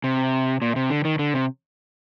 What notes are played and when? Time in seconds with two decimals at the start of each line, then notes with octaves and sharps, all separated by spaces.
0.04 C3
0.62 A#2
0.76 C3
0.90 D3
1.05 D#3
1.19 D3
1.34 C3